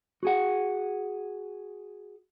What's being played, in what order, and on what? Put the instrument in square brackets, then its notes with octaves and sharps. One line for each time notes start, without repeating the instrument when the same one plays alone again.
[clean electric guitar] F#4 G#4 F#5